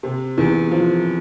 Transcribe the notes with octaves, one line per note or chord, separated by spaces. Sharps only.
C3
E2
F3